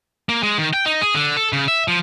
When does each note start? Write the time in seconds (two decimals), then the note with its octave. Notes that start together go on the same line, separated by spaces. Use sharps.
0.29 A#3
0.43 G#3
0.58 D#3
0.74 G5
0.86 D#4
1.01 G#4
1.15 D3
1.37 A4
1.53 C#3
1.68 E5
1.88 F3